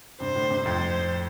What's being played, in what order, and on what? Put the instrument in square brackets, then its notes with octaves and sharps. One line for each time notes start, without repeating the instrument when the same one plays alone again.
[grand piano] G2 C3 [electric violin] C5
[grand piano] A2 D3
G2 C3
[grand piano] F2 A2 [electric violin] C5